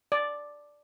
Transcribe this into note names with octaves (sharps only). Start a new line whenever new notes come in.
D5